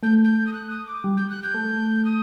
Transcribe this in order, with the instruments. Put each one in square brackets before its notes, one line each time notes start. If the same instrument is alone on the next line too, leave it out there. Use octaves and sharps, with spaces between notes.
[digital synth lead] A3 [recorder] G6
[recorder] G6
D#6
F#6
D#6
D6
[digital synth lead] G3
[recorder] G6
F#6
G6
[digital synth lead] A3
[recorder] D#6